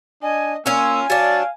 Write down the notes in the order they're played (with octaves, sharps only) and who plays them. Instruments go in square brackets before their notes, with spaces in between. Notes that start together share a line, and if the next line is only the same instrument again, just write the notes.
[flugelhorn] D4 [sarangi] D#5 [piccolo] G#5
[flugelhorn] A#3 [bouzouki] C#4 F4 [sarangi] G#5 [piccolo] E6
[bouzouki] F#3 D4 [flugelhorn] F5 [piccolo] A6